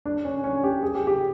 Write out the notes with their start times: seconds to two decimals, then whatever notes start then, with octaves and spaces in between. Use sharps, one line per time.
0.06 D4
0.25 C#4
0.44 C#4
0.64 G4
0.83 G#4
0.95 G4
1.07 G4